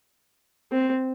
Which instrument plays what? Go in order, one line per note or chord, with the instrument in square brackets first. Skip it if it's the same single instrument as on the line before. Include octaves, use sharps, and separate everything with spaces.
[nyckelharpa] C4